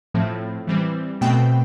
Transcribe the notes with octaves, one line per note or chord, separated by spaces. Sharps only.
A2 F3 A3 C4
E3 G3 C4
B2 A3 C4 G5